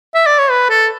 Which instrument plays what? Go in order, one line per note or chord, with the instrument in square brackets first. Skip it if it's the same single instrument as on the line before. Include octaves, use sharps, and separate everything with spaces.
[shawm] E5
D5
C#5
B4
A4